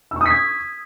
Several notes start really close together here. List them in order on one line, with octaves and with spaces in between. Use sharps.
E6 C#6 D#6 B6 G#6